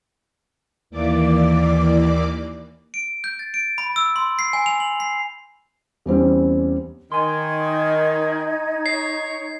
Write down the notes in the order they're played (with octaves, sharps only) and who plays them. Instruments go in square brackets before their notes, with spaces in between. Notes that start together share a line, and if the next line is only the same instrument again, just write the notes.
[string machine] D#2 E3 A#3 D5 D6
[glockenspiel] D7
G6
A6
D7
B5
E6
C6
C7
G#5
F7
F#7
C7
[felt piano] E2 G3 C4 C#4
[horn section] D#3 [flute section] D#4 G#6 [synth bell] G#5 C6
[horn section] C#5 [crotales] C7